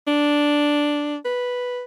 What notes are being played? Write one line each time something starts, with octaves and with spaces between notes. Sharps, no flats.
D4
B4